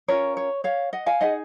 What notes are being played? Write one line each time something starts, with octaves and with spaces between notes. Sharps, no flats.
C#4 F4 A#4 C#5
C#5
C#5 F5
D#5 F#5
F5 G#5
D#4 G#4 D#5 F#5